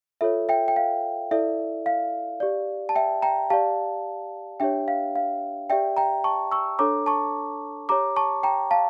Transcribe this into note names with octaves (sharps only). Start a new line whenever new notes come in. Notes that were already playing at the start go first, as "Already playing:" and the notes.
F4 A4 C#5 E5
E5 G5
G5
F5
E4 A4 D5 E5
F5
G4 D5
A5
E5 G5
G5 A#5
G4 D5 F5 A5
D4 G4 C#5 E5 G5
F5
F5
G4 D5 E5 G5
G5 A#5
A5 C#6
C#6 E6
D4 A4 C#5 A#5 D6
A5 C#6
G4 C#5 A#5 D6
A5 C#6
G5 A#5
F5 A5